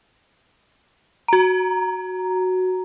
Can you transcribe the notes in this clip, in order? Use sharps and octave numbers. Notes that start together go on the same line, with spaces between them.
F#4 A#5